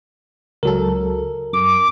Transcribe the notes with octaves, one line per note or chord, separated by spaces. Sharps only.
C#2 F#3 A4 A#4
F#2 D6